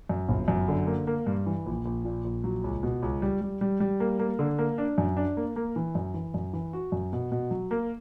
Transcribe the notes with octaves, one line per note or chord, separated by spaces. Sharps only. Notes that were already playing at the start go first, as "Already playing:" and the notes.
F#2
G1
F#2
D3
A#3
A#3
G2
E3
A#1
A#1
A#2
A#1
F#3
C#2
B2
C#2
G3
G3
G3
G3
A#3
A#3
D3
A#3
D4
F#2
D4
A#3
A#3
E3
F#2
E3
F#2
E3
F#4
F#2
B2
B2
F#3
A#3